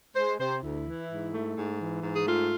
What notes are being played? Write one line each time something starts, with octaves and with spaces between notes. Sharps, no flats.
G#3 C5
C3 C5
D2 E4
E3
G#2
A3
G#2
E3
G#2
G#4
A3 F4